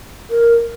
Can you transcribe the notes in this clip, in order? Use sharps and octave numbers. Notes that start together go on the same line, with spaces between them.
A#4